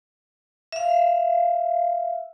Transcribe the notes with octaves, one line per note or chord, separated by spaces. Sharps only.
E5 F5